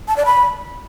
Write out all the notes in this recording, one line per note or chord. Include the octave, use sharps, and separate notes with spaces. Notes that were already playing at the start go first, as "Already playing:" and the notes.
A5
D5
B5